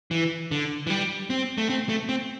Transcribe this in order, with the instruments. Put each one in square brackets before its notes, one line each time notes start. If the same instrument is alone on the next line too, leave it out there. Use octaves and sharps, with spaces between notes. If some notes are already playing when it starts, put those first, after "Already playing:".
[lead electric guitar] E3
D3
E3
G3
C4
A3
C4
A3
C4